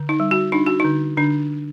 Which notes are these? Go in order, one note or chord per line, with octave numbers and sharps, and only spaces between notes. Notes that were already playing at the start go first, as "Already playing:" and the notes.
Already playing: D3
D#4
G3
F#4
D4 D#4
F#4
D3 D#4
D3 D4